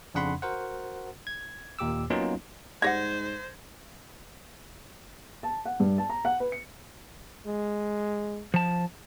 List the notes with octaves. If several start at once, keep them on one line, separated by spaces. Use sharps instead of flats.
F2 C#3 D4 F#5 B5 C6
F#4 A#4 C5 F#5
G#6
D#2 A#2 G4 D6 E6
F#3 A#3 B3 C#4 D#4 F4
G#2 G3 C5 C#5 F#5 G#6 A#6
A5
F#5
G2
A5
A#5
F#5
B4
C#7
G#3
F3 A5